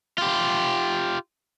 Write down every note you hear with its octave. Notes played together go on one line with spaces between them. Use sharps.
F4 G4